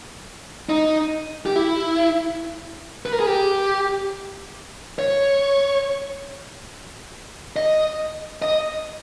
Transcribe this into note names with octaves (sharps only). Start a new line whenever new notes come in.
D#4
G4
E4
B4
A#4
G#4
G4
C#5
D#5
D#5